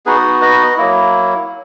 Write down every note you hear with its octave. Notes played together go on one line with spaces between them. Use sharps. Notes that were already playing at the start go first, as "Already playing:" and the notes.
B3 D#4 F#4 G#4 B4
B4 D#5
F#3 A#3 E4